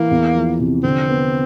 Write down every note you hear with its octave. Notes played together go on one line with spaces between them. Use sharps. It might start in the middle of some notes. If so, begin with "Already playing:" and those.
Already playing: E3 A#3
E2
F3
C3
D3 C4
B3